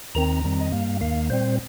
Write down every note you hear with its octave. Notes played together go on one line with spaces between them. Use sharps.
D#2 D#3 C4 A#5
F2 D#3 G3 C4
D#5
G2 G3 A#3 F5
D#2 D#3 A#3 F5
A#2 G3 C4 C5